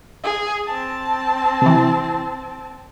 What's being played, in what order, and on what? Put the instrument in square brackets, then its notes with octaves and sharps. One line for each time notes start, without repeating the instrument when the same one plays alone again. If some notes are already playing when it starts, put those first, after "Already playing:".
[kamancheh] G#4
C4 A5
[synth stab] C3 E3